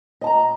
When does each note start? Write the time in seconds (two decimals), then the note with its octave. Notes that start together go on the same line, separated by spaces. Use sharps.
0.21 D#5
0.24 A5
0.27 A#5